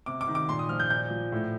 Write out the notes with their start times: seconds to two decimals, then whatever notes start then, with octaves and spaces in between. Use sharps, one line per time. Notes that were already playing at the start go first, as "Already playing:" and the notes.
0.06 C3 D6
0.21 D6
0.28 D#3
0.35 D6
0.49 A#2 C6
0.59 D#6
0.69 F3 F6
0.80 G6
0.90 A#2 G6
1.11 F3
1.32 A2